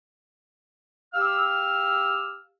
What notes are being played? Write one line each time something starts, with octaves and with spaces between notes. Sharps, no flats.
G4 F5 E6 F6